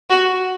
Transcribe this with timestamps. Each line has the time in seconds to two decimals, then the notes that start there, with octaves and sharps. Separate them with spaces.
0.10 F#4